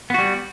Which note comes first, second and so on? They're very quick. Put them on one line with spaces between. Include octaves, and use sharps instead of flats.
B3 F#4 G3